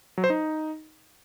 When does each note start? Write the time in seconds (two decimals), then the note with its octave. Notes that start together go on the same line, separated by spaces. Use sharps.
0.18 F#3
0.24 C5
0.30 D#4